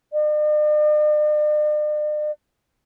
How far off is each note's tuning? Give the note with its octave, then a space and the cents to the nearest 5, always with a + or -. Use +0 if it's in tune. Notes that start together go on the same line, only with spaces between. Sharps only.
D5 +45